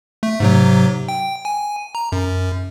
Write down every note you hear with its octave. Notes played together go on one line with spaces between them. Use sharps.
A3
G#2 C3 F#3
G5
G#5
A#5
F#2